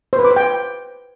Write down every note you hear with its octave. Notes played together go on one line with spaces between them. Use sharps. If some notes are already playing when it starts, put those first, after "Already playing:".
C5
B4
D6
C5
G5